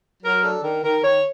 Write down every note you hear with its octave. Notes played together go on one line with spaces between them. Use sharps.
F#3 A#4
D4 A4
D#3 A#4
D#3 A#4
D#3 C#5